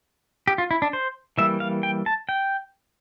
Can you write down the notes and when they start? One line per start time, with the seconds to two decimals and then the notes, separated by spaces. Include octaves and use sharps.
0.47 G4
0.58 F4
0.71 E4
0.82 D4
0.93 C5
1.38 E3 G3 A#3 E5
1.60 F5
1.83 G5
2.06 A5
2.29 G5